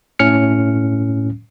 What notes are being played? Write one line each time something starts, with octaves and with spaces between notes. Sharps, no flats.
A2 C#4 F6 C#7